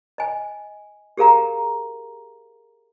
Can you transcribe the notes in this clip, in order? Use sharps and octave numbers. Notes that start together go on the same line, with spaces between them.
D#5 G#5
G4 G#4 A#4 F5 A#5